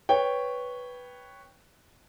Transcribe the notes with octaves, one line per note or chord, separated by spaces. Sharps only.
B4 C#5 G5